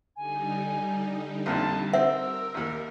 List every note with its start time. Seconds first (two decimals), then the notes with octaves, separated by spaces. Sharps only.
0.16 D3 G3 D#4 G#5
1.46 A1 F2 A#2 A5
1.93 C4 A#4 E5 F#5 E6
2.54 A1 D#2